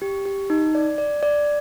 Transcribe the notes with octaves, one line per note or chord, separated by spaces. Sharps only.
G4
G4
D#4
D5
D5
D5